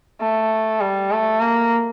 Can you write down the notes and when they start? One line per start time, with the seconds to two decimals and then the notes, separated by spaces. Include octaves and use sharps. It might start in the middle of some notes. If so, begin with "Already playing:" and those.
0.21 A3
0.81 G3
1.12 A3
1.41 A#3